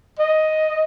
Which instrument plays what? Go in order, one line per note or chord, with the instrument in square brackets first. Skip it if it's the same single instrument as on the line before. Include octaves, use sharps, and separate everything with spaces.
[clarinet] D#5